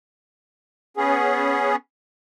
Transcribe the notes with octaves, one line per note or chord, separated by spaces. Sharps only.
B3 C#4 G#4